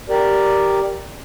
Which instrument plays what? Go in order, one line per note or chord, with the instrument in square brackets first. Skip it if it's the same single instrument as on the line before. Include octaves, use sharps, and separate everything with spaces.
[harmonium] G4 A#4 D5